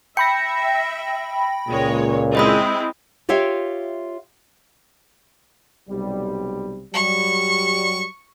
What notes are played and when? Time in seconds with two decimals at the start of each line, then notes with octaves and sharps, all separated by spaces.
0.17 E5 G5 B5 A#6 C#7
1.69 C#2 A#2 G#3 C#5
2.35 G#3 C4 E4 D#5 B5 D#6
3.29 F4 G4 C#5 E5 F5 G5
5.90 B1 C3 G3
6.94 F#3 G3 C#6